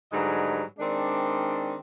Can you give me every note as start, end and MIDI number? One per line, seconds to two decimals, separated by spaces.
0.11 0.61 44
0.11 0.61 50
0.11 0.61 54
0.11 0.61 55
0.11 0.61 71
0.11 0.61 75
0.78 1.76 51
0.78 1.76 56
0.78 1.76 60
0.78 1.76 62